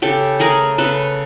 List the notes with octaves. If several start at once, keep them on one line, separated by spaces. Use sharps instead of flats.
C#3 G4 A4
A3 G#4 A#4
C#3 A4 B4